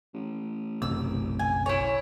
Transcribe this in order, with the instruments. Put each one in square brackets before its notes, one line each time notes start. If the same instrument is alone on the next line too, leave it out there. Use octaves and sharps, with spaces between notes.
[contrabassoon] A1
[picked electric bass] F#1 B1 C3 [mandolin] E6
[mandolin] G#5
E4 C#5